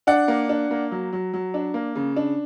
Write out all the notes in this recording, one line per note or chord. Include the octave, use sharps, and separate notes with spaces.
D4 D5 F#5
A#3
D4
A#3
F#3
F#3
F#3
D4
A#3
C#3
D4